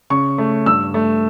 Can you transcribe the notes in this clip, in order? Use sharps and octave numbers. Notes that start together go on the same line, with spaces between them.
C#3 C#6
A3
G2 E6
A3